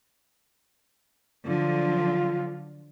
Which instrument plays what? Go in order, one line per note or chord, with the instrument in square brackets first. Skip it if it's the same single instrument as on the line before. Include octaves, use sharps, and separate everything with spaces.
[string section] D3 F3 F#3 [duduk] F4